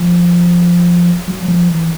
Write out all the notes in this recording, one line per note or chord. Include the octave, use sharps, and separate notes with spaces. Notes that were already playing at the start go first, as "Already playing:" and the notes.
Already playing: F3
F#3
F#3
F3
E3